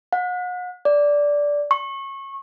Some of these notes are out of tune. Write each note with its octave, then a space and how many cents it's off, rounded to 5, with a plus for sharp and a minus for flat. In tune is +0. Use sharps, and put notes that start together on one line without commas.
F#5 -40
D5 -10
C#6 -25